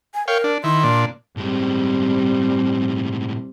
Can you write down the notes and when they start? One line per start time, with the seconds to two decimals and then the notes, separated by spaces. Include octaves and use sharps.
0.14 G#5
0.28 A#4 C#5 F5 G5
0.44 D4
0.64 D#3 E4 C6
0.83 A#2 D4
1.37 A2 G3 G#3 C4